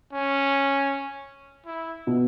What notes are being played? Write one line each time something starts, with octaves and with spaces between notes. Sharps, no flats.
C#4
E4
B2